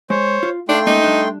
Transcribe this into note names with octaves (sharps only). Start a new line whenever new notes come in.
G#3 C5 C#5
F4
A3 D4 D#4 D5 F5 G5 C6
G#3 A#3 C#4 D#4
G3 D4